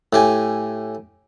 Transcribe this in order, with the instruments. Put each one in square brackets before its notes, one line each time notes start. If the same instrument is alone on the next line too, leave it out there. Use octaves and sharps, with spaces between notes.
[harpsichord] A2 G4 G#5